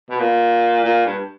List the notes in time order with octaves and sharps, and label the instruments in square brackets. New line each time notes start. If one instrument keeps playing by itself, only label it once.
[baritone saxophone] B2
A#2
A#2
G2